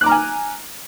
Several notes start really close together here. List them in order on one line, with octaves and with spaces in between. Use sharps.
F#6 D6 A#5 F6 G#5